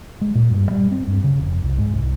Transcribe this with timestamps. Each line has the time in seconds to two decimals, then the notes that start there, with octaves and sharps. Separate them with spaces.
0.21 G#3
0.35 A#2
0.50 G2
0.71 G3
0.91 C4
1.07 G2
1.24 C#3
1.39 F1
1.62 C2
1.78 G#2
1.93 C2